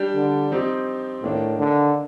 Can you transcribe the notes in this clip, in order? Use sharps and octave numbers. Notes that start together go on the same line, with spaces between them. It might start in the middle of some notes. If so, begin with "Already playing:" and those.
Already playing: G3 D4 G4
D3
F3 C4 D#4 G4
A2 D#3 A#3 D4
D3